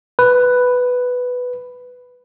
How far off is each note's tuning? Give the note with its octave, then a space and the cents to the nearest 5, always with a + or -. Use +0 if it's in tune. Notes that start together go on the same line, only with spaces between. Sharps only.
B4 +5